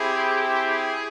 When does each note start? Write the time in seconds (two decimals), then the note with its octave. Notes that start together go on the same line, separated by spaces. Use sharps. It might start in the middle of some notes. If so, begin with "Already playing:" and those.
Already playing: C4 E4 G4 G#4
0.42 G#4